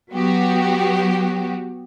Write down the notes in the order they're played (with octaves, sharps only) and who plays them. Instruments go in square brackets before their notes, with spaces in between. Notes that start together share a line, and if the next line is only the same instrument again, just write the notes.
[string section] F#3 B3 F#4 G4